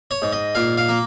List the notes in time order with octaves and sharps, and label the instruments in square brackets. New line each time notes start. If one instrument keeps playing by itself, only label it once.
[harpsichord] C#5
G#2
D#5
A#2 F5
F5
A#3